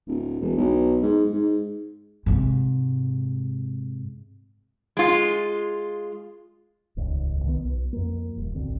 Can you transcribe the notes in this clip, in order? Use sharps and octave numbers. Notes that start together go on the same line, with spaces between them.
D1
E1
B1
G#2
G#2
G#2 C3
G#3 F4
D#1 C#2 G#2
C2 D#3 G#3 B3
B1
F2 A#3
D#1
A1 D2 D3 C4